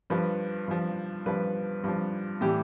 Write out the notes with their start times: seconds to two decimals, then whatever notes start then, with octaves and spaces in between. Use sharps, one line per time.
0.10 G2 F3 B4
0.68 G2 F3
1.26 G2 F3 B4
1.84 G2 F3
2.41 A2 E3 G3 G4